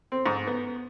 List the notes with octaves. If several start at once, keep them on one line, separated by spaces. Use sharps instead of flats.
C4
G#2
B3